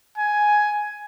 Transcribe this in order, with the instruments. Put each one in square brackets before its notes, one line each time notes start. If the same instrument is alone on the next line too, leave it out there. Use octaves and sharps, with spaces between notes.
[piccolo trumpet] G#5